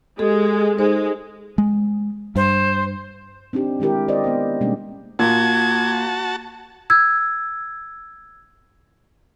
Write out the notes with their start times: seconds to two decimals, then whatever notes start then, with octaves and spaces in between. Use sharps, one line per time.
0.19 G#3 G4 A4
0.78 G#3 D#4 C5
1.58 G#3
2.36 G2 C5
3.53 C4 D4 D#4 G4
3.80 D#3 G#3 E4 G4 A#4
4.08 A#4 C5 D5 D#5
4.24 B3 C5
4.61 B2 G3 G#3 A#3 C#4 D4
5.19 A#2 F#4 A5 G#6
6.90 E6 G#6